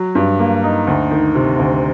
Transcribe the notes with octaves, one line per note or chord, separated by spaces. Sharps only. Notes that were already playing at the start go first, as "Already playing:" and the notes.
Already playing: F#3
G2
A#3
D#4
D2
D#3
C3
D2